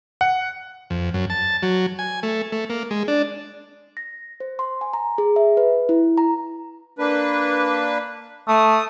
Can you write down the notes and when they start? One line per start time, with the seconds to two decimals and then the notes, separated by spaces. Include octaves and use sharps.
0.21 F#5
0.90 F2
1.14 F#2
1.30 A5
1.63 F#3
1.99 G#5
2.23 A3
2.52 A3
2.70 A#3
2.91 G#3
3.08 D4
3.97 A#6
4.40 C5
4.59 C6
4.81 G#5
4.93 A#5
5.18 G#4
5.36 E5
5.57 B4
5.89 E4
6.18 A#5
6.99 A#3 D4 B4
8.48 A3 D#6